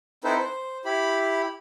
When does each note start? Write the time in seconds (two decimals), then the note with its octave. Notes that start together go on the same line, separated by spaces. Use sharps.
0.24 C4 D#4 E4 A4 B4 C5
0.39 C5
0.85 E4 G4 B5